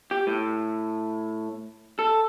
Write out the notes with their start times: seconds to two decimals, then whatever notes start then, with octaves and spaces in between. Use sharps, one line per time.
0.11 G4
0.27 A2
1.99 A4